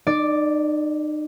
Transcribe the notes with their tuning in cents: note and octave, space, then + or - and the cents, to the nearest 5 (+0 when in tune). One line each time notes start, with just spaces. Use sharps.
D#4 -35 D5 +0